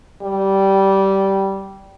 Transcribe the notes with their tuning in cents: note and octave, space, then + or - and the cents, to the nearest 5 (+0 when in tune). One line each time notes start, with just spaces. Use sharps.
G3 -15